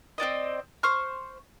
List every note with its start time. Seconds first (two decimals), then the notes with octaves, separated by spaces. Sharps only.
0.18 C4 F#4 D5 D#5
0.83 C5 C#6 F6